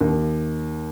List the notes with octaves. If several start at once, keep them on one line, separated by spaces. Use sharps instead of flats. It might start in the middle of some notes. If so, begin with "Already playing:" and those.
D#2